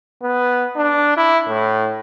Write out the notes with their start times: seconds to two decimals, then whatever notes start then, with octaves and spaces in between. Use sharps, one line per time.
0.22 B3
0.76 D4
1.17 E4
1.48 A2